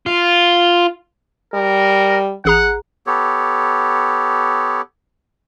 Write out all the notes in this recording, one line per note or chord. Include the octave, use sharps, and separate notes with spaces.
F4
G3 A#4
A1 G#4 F#5 A#5
B3 G4 A4 C#5